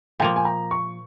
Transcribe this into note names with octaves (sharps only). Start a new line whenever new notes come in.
A#2 F3 A#3 G5
G#5
A#5
C#6